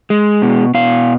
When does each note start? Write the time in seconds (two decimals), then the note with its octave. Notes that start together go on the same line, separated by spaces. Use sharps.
0.10 G#3
0.42 B2
0.74 B2 F5